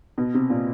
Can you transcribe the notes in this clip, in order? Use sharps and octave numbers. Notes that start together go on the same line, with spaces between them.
B2
C3
A#2